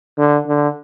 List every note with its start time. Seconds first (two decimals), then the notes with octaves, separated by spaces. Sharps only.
0.18 D3
0.47 D3